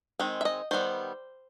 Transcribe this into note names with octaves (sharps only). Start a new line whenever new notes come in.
D#3 G#3 C4
E5
D#5
D#3 G3 B3 C5